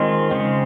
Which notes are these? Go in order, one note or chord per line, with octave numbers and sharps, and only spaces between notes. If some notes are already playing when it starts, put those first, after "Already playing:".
Already playing: D#3 G#3 C4 F4
C#3 G#3 C4